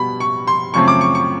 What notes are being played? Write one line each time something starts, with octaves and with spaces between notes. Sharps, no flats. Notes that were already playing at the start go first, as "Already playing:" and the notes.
Already playing: B2 G3 B3 B5
C#6
C6
F#2 C#3 F3 A3 C4 C#6
D6
C#6
C#6